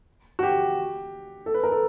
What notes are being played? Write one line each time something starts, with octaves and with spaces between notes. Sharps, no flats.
F#4
G4
A4
B4
A#4
A4